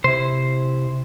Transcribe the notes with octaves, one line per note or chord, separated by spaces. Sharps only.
C3 E4 C5